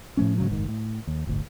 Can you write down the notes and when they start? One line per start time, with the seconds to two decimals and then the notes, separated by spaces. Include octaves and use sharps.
0.17 A2 F3 A3 C#4
0.38 G#2 C#3 F#3
0.51 F#1 G#2 D#3
0.68 A2
1.07 D#2
1.27 D1 G1 D2